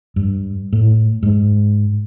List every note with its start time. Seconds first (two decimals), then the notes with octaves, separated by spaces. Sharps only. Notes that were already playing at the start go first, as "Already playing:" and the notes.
0.16 G2
0.73 A2
1.23 G#2